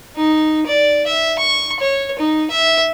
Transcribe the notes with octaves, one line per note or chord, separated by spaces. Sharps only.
D#4
D5
E5
C#6
C#5
D#4
E5